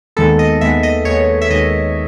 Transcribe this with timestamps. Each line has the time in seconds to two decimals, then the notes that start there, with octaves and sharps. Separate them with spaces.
0.17 D#2 D#3 G#3 B3 A4
0.39 D#5
0.61 D#2 D#3 G#3 B3 E5
0.83 D#5
1.05 D#2 D#3 G#3 B3 C#5
1.42 E5
1.50 D#2 D#3 G#3 B3 D#5